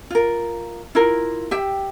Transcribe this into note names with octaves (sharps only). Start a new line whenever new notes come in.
F4 A#4
E4 F4 A#4
G4 E5 G5